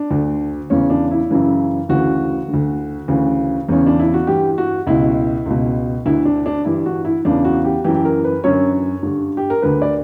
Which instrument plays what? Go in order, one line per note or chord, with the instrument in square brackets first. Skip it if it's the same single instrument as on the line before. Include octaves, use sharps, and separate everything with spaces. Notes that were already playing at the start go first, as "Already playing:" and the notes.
Already playing: [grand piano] D4
D2 D3
E2 C#3 E3 C#4
D4
E4
F#2 C#3 E3
D2 C#3 E3 F#4
D3
D2
D2 C#3 E3
E2 C#3 E3 C#4
D4
E4
F#4
G2 E3 G4
F#4
C#2 B2 E4
C#2 B2
D2 D3 E4
D4
D4
G2 E3 E4
F#4
E4
E2 C#3 E3 D4
F#4
G4
F#2 E3 G4
G4
A#4
B4
F#2 D3 C#5
G2 D3
G4
A#4
D2 D3 B4
D5